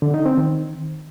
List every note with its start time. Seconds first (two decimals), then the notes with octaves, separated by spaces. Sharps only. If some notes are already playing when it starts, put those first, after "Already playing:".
0.02 D3
0.14 D#4
0.26 C4
0.37 D#3